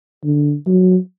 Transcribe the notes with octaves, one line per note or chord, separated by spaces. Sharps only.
D3
F#3